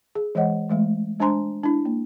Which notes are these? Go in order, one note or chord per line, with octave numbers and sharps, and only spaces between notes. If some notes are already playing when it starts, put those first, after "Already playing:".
G#4
E3 G#3 C#5 D#5 F#5
E3 G#3 A3
G#3 D4 C5 G#5 A#5 C6
D4 E4
A#3